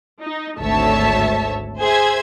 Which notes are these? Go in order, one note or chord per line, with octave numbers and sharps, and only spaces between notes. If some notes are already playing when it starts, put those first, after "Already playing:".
D#4
G#1 D2 A3 C#5 E5 A5
G#4 C5 E5 G#6